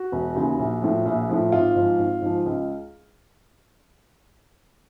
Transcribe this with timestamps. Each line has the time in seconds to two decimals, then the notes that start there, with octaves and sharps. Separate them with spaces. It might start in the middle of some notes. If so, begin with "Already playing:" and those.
Already playing: F#4
0.12 E1
0.35 D#2 C#3 E3
0.59 A#1
0.81 A2 F3
1.05 A#1
1.29 A2 F3
1.52 G#1 F4
1.76 G#2 F3
1.99 G#1
2.22 G#2 F3
2.46 C#2